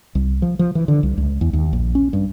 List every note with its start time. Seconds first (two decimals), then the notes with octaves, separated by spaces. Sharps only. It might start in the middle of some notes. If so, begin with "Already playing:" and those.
0.15 C2
0.42 F3
0.59 F3
0.75 E3
0.88 D3
1.03 C2
1.17 C#2
1.41 E2
1.53 D#2
1.73 A#1
1.95 C#4
2.13 G2